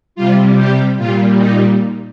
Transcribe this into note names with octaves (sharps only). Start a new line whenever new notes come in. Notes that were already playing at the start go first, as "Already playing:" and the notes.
C3 G3 F4
G4
A#2 G3 F4
D#4